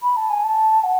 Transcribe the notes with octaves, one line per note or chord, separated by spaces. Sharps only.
B5
A5
G#5
A5
F#5